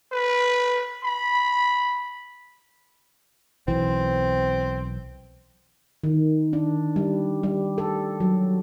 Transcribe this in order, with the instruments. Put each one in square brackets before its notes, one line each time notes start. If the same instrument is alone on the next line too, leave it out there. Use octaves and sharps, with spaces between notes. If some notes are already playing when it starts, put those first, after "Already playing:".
[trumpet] B4
B5
[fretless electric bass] B1 E3 [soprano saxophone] C4
[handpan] D#3
D4
G3
G3
A4
F#3